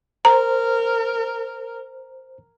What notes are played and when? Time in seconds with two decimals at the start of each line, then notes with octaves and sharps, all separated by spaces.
0.25 A#4 C5 A#5